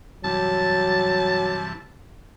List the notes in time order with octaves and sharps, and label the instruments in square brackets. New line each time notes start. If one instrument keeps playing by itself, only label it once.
[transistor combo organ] G2 C3 E3 [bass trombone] F#3 [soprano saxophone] A5